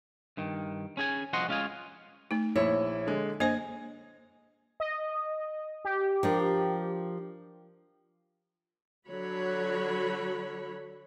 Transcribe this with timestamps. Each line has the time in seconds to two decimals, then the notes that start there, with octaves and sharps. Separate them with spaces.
0.37 G2 D#3
0.97 C#4 G#4 G#5
1.33 C2 F3 F#4 D#5 F#5 C6
1.48 G#3 C#4 F4 D#5 F5 G#5
2.31 A3 D#4
2.56 A#1 E4 C#5 E5
3.07 D3 G#3
3.40 A#3 D4 C5 D#5 G#5 G#6
4.80 D#5
5.85 G4
6.23 F3 D4 A#4
9.08 D3 F#3 F#4 C#5 B5